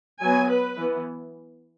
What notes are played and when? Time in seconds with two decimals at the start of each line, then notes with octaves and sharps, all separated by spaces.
0.21 F#3 B3 G#5
0.50 B4
0.78 E3 B3